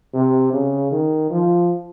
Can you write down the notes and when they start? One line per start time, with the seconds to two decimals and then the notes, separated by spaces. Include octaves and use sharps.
0.14 C3
0.53 C#3
0.91 D#3
1.30 F3